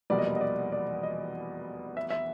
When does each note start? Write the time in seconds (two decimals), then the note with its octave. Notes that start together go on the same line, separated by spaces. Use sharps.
0.10 F1 E2 B2 G3 A#3 D5
0.18 D#5
0.27 D5
0.36 D#5
0.41 D5
0.72 D5
1.03 D#5
1.97 E5
2.10 E5